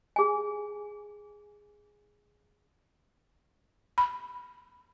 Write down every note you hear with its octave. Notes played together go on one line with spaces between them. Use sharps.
G#4 G#5
B5